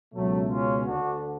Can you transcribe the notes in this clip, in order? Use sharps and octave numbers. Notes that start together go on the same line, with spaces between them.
C#2 B2 F#3 A3
C#4 F4
D2 D3 D4 F#4